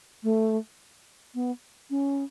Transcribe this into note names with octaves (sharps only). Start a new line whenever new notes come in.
A3
B3
C#4